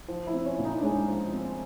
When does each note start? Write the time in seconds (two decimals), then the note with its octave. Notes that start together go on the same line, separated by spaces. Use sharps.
0.08 F3
0.27 E4
0.33 C4
0.45 C#4
0.58 A#2
0.65 D#4
0.78 D4
0.83 G#3 C#4
1.08 F3
1.33 C4